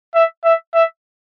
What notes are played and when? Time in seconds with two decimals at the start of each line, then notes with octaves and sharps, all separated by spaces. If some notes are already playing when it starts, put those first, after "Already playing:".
0.15 E5
0.45 E5
0.75 E5